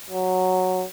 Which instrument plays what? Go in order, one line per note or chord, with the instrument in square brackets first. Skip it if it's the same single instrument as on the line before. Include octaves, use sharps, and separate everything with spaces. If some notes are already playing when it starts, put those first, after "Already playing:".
[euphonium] F#3